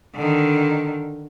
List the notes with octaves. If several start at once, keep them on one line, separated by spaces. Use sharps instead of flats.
D3 D#3